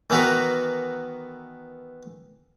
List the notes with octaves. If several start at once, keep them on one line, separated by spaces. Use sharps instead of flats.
D#3 E3 B3 F#4 A#4 B4